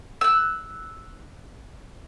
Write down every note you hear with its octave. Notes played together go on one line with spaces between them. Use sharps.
E6 F#6